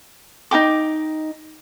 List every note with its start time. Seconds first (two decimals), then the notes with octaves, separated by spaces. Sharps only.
0.51 D#4 F#4 G5 D6